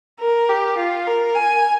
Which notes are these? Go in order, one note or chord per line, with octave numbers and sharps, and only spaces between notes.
A#4
G4
F4
A#4
G#5